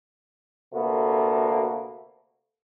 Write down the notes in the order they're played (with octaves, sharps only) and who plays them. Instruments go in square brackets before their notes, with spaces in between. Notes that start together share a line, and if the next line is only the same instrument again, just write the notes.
[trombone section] D2 C3 A#3 B3 F#4 A4